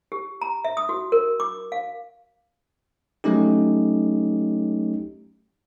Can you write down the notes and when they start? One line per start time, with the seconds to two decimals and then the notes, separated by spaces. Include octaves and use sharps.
0.12 G4
0.42 A#5
0.65 E5
0.77 D#6
0.89 F#4
1.12 A#4
1.40 D6
1.72 F5
3.24 F#3 A3 C#4 D#4 G4